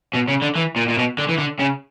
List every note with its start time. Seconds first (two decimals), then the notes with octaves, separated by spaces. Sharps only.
0.14 B2
0.28 C#3
0.42 D3
0.55 E3
0.76 A#2
0.88 A#2
0.98 B2
1.18 D3
1.29 E3
1.38 D3
1.59 C#3